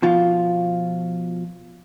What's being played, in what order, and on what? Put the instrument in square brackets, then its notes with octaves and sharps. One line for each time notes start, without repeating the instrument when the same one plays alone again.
[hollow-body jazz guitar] B2 F3 F4